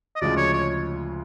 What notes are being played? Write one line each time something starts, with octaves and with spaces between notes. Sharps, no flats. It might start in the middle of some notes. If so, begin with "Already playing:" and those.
D#5
D2 C#3 F3 G#3 D5
C#5
C#5